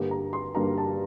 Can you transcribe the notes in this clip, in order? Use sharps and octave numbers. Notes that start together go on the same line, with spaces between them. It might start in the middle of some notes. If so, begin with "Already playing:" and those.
Already playing: G2 D3 G3 A#3
A#5
C6
G2 D3 G3 A#3 A#5
A5